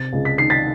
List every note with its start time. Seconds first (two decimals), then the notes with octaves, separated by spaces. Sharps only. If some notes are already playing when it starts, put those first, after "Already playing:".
Already playing: C3 A6
0.13 C#2
0.25 B6
0.38 D#3 C7
0.50 A6 B6